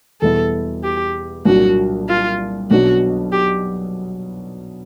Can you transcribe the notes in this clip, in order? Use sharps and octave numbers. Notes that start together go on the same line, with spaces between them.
E2 B2 G3 B3 E4 A4
G4
C2 A#2 F#3 A#3 D4 F#4
F4
B1 B2 F#3 B3 D4 F#4
G4